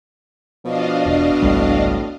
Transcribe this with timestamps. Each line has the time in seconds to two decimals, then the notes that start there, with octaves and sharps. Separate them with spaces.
0.65 B2 F3 D4 D#5 F5
1.06 E1
1.42 G#1 C#2 A2 G3